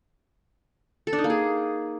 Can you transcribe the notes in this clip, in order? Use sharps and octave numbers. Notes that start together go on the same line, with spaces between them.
A4
D4
D#4
A#3
G#4